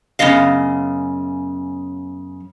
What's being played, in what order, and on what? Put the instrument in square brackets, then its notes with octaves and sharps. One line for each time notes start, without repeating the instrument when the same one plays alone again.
[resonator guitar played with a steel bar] F#2 C#3 B3 D#5 F5